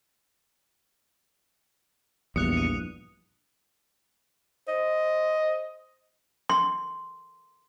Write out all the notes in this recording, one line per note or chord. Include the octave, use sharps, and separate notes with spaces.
A#1 E2 G2 D#6 F#6 C#7 F7
D#6 D#7
C5 D#5
C6